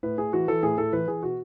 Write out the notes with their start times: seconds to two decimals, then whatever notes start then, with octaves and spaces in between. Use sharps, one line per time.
0.03 A2 B4
0.18 A2 G#4
0.33 E3 F#4
0.48 E3 A4
0.63 A2 G#4
0.78 A2 A4
0.93 E3 B4
1.07 E3 G#4
1.22 B2 F#4